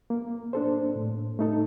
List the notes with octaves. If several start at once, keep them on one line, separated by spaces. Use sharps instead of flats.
A#3
D4 A4 C5
A2
A3 D#4 A4